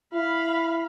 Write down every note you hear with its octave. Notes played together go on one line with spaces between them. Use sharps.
E4 F5 B5